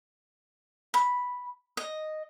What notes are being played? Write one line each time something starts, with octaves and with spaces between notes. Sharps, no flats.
B5
D#5